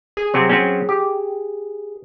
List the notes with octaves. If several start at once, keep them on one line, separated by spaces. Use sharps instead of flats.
G#4
C3 F#3 C4
F#3 C4 C#4
G4